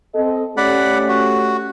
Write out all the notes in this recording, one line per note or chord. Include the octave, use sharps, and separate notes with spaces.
C4 A4 D#5
A3 C#4 G4 D5 F#5 B5
F#4